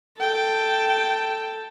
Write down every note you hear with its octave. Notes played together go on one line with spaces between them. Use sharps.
A4 G5